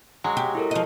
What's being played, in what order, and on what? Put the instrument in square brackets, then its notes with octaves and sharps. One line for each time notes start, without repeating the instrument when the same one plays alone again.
[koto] F#3 G#3
[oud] G4
[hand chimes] E4 A4 A#4
[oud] F3 D#5